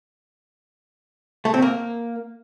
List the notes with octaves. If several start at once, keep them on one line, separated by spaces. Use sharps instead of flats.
A3
C4
A#3